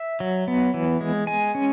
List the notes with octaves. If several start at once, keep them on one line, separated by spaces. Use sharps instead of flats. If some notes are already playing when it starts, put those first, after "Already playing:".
Already playing: E5
F#3
B3
E3
G#3
G#3 G#5
C#4